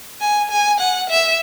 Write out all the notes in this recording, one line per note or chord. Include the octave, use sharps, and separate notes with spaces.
G#5
G#5
F#5
E5